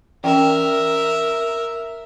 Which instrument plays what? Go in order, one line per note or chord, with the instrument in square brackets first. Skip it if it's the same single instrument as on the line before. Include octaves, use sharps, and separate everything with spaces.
[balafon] E3 C#4 G5 [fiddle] A#4 E5